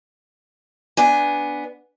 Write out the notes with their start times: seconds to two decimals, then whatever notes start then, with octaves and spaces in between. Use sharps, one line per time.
0.97 B3 D4 G#5